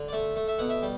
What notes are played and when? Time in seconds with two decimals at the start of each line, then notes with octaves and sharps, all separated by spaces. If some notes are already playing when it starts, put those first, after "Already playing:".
Already playing: D3
0.08 D5
0.13 A3 E5
0.36 A3
0.48 E5
0.59 B2 F#5
0.69 E5
0.82 G3